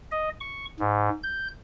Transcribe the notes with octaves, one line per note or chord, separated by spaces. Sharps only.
D#5
C#6
G#2
G6